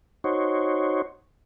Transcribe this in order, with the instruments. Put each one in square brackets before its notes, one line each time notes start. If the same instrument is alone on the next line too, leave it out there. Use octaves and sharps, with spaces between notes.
[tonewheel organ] D#4 F#4 C5 C#5